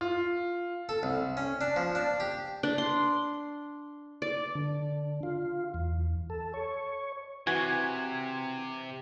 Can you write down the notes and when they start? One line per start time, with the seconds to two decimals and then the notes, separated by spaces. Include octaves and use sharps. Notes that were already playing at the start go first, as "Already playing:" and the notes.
0.01 F4
0.89 A4
1.03 C2
1.37 C#4
1.61 D4
1.76 F3
1.95 D4
2.20 G4
2.63 D4
2.78 C6
4.22 D5
4.55 D3
5.23 F4
5.74 E2
6.30 A4
6.54 C#5
7.47 C3 E3 F#4 G#5 G#6